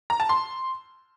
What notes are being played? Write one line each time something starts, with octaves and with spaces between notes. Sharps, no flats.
A#5
A5
C6